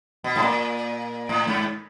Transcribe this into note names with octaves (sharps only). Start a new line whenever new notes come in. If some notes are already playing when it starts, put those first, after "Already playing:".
B2
A2
A#2
A2
G#2